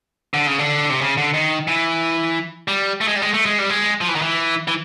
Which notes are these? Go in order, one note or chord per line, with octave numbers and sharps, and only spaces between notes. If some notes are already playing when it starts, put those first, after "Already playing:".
D3
C#3
D3
C3
C#3
D3
D#3
E3
G3
A3
G#3
G3
G#3
A3
G#3
G3
G#3
F3
E3
D#3
E3
E3